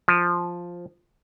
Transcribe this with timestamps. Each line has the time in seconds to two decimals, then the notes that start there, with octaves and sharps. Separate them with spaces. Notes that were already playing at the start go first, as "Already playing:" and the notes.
0.08 F3